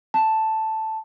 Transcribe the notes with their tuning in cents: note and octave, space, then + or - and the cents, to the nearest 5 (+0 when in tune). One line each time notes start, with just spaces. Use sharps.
A5 +0